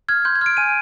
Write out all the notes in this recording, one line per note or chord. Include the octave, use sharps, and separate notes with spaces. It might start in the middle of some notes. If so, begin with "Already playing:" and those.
F6 G#6
C6 G6
G#6
F6 D7
G#5 D#7